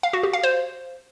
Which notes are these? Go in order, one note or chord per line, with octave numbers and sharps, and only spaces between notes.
F5
F#4
G4
F5
C5